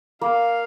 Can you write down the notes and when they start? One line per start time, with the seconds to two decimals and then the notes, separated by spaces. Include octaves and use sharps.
0.21 A#3 F5